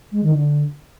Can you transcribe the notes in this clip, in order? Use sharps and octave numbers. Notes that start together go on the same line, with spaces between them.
G#3
D#3
D3